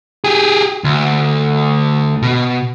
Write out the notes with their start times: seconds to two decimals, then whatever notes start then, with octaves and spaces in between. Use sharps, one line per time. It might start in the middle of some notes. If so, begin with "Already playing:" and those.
0.24 G4 G#4
0.84 D2
2.22 B2